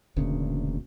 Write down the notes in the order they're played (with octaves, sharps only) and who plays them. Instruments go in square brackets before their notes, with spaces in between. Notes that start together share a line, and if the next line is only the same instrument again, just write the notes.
[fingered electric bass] E1 D2 A#2 C#3